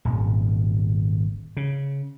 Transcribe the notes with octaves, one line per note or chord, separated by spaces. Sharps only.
D#1 G#1
C#3